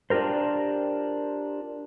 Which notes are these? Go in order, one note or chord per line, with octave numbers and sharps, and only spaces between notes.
D4 F4 G4 A#4 C5